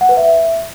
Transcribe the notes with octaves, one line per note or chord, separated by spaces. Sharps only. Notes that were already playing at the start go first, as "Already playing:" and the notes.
F#5
B4
E5